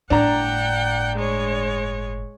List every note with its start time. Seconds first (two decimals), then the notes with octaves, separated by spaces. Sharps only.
0.10 G1 A2 D4 F#5 G5 A#5
1.16 G#3 C#5